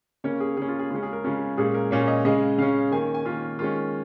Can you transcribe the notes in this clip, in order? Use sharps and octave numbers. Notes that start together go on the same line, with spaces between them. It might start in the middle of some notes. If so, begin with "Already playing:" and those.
C#3 A#3 C#4 C#5
G#4
C#3 A#3 C#4 G#4
F4
G#4
C#3 G#3 C#4 F4
G#4
A#4
C#3 G#3 C#4 F4
A#2 G#3 C#4 G#4
A#4
A#2 G#3 C#4 C#5
D#5
C#3 G#3 C#4 D#5
C#3 G#3 C#4 F5
D#3 A#3 C#4 G#5
G#5
D#3 A#3 C#4 F4
D#3 G#3 C#4 F4